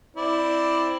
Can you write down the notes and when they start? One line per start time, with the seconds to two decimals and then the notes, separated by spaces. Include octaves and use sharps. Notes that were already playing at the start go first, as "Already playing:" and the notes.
0.17 C4 E4 D5